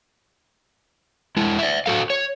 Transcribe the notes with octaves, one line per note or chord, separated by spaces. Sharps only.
G#3 E4
D5 E5
F#4 A4 F5
C#5